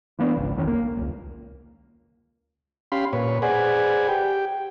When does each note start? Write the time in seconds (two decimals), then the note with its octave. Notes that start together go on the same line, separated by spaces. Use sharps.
0.19 E3 A#3 B3 D4
0.37 G#1 C#2
0.56 B1 E2 D#3 C#4
0.67 A#3
0.97 D#1 C#2
2.92 C#4 G4 F5 B5 C6
3.13 A#2 B4 C#5
3.42 G#4 B4 C5 D5 F#5 G#5
4.08 G4 G5